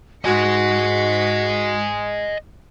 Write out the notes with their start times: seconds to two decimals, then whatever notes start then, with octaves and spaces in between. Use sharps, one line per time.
0.25 G#2 F#4 D#5 G#5 B6 C#7